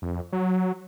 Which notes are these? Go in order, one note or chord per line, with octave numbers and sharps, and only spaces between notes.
F2
F#3